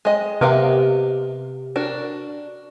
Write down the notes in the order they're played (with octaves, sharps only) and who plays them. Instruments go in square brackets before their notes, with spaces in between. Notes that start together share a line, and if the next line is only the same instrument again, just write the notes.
[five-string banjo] G#3 D#5
[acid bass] C3 [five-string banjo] B3 A#4 F5
[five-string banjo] D4 F#4 A#4